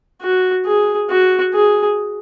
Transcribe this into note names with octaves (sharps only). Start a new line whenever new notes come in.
F#4
G#4
F#4
G#4